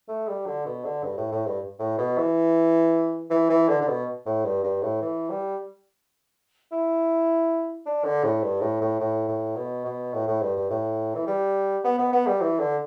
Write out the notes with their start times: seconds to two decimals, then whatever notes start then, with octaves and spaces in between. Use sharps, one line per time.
0.08 A3
0.28 G3
0.46 D3
0.65 B2
0.84 D3
1.03 G2
1.17 A2
1.32 A2
1.46 G2
1.79 A2
1.98 B2
2.17 E3
3.30 E3
3.49 E3
3.69 D3
3.81 D3
3.87 B2
4.26 A2
4.44 G2
4.63 G2
4.82 A2
5.02 E3
5.30 G3
6.72 E4
7.86 D4
8.05 D3
8.24 A2
8.43 G2
8.61 A2
8.81 A2
9.00 A2
9.28 A2
9.56 B2
9.85 B2
10.14 A2
10.27 A2
10.42 G2
10.56 G2
10.70 A2
11.15 E3
11.27 G3
11.84 B3
11.98 B3
12.13 B3
12.27 G3
12.41 E3
12.59 D3